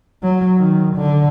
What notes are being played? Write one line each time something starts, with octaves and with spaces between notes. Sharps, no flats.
F#3
D#3
D3